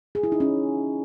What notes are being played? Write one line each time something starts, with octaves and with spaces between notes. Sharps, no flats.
G#4
E4
D#4
C#4